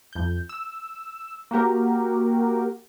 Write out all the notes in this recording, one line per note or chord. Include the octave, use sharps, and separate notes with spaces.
F2 G6
E6
A#3 F#4 G4 A#4